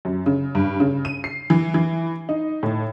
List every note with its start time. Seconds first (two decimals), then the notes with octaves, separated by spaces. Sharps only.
0.05 F#2
0.26 C#3
0.55 G2
0.80 C#3
1.05 D#7
1.24 C7
1.50 E3
1.74 E3
2.29 D#4
2.63 A2